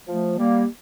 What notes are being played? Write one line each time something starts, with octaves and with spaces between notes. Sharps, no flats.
F3 A3
G3 A#3